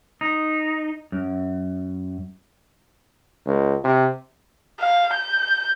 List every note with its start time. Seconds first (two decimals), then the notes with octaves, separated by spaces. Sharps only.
0.21 D#4
1.12 F#2
3.46 C#2
3.84 C3
4.80 F5
5.14 G6